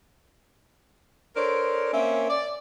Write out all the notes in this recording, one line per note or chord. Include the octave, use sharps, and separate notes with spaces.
D4 A4 A#4 C5 C#5
A#3 C4 C#4 E5
D5